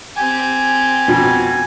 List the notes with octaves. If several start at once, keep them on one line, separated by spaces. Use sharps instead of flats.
C4 G4 G#5
F2 B2